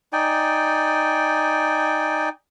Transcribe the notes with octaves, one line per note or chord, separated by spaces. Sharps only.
D#4 D5 G5 G#5